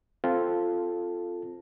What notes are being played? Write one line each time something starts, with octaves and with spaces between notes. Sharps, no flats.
C4 F4 A4